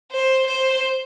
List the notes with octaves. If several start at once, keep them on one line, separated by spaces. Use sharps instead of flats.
C5
C5